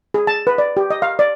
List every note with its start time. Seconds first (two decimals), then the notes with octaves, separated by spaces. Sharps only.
0.14 G#4
0.27 A5
0.47 B4
0.58 D5
0.77 G4
0.90 D#5
1.02 F5
1.19 D5